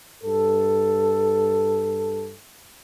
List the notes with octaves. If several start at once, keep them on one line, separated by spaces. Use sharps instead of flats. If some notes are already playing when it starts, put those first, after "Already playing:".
G2 A4